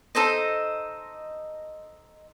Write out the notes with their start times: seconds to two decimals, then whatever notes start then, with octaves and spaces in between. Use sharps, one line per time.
0.15 D#4 A4 C5 D#5